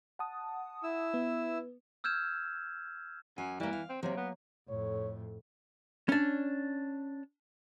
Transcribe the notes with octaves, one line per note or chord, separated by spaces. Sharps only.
F#5 A5 D#6
E4 E6
B3
E6 F6 G6 G#6 E7
F#2 G#5
E3 G3 A#3
F5
C4
C3 F#3 A#3
B3
F2 A2 C#5
C#4 D4